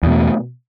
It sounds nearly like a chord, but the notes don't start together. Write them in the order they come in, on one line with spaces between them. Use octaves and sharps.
E2 B2 A3